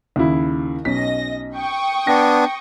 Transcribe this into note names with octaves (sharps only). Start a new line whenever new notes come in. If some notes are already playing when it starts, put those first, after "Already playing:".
D#2 C#3 E4
B1 C#4 D#5 A#6 B6
G5 C#6 D#6
B3 D4 A#6